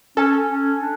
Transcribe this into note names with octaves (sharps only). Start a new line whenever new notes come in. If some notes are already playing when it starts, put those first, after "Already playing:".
C#4 A4
C#4
D4